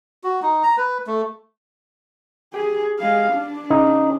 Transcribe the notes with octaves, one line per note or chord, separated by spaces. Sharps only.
F#4
D#4
A#5
B4
A3
G4 G#4
G#3 F5
D4
C#3 D#4